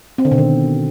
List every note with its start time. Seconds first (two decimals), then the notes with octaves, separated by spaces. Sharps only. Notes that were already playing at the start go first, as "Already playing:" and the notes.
0.18 C4
0.25 D3
0.31 B2
0.38 D#3